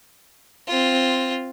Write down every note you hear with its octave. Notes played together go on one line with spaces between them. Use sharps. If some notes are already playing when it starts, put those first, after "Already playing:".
C4 F4